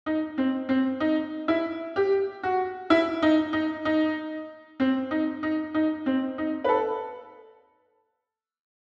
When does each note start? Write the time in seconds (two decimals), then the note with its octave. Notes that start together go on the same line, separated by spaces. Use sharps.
0.06 D#4
0.38 C4
0.69 C4
1.00 D#4
1.48 E4
1.96 G4
2.43 F#4
2.90 E4
3.22 D#4
3.53 D#4
3.85 D#4
4.80 C4
5.11 D#4
5.43 D#4
5.74 D#4
6.06 C4
6.38 D#4
6.64 B4
6.69 A4